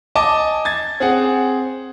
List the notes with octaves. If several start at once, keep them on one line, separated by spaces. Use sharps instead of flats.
D#5 G#5 A5 D6
G#6 A6
C4 G#4 F#5